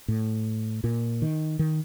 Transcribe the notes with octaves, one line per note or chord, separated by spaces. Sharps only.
A2
A#2
D#3
D#3